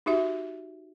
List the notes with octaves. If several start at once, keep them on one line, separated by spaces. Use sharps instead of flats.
D#4 F#4 G4 E5